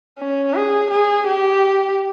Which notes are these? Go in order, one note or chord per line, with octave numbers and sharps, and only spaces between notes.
C#4
G#4
G#4
G4